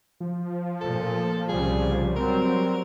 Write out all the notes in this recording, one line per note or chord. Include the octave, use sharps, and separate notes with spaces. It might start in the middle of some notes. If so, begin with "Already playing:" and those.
F3
A1 A#2 A4
C2 C#3 G3 G#4
F#3 G3 C4 A#4